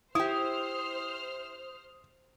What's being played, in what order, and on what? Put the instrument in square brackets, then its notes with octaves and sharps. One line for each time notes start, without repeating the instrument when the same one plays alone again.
[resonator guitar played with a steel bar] E4 G4 [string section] C5 F6 [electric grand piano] D#6